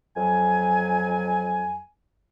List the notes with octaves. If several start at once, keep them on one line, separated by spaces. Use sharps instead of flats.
F2 F#3 G#5